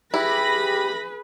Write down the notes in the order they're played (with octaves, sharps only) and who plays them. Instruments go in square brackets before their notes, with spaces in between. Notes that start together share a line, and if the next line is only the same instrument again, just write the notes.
[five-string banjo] E4 [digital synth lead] G4 [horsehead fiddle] G#4 B4 [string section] B5 A#6